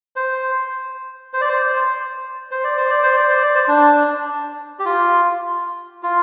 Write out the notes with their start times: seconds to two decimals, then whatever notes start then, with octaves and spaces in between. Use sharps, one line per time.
0.16 C5
1.34 C5
1.41 D5
1.49 C5
2.51 C5
2.64 D5
2.77 C5
2.90 D5
3.03 C5
3.17 D5
3.30 C5
3.42 D5
3.55 C5
3.68 D4
4.79 G4
4.85 F4
6.03 F4